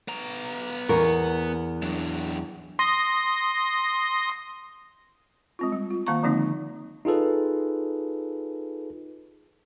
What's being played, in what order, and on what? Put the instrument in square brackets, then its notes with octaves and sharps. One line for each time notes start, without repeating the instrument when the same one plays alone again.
[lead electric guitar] B3 A#5
[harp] E2 C#6 [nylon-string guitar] A#4
[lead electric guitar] F#3 D4
[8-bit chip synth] C6 D#6 A#6
[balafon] G#3 C4 F4
G3
F4
D#3 A#3 F5 A5 A#5 C#6
D3 F3 G#3 A#3 C4 D#4
[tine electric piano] D#4 F4 G#4 A4 B4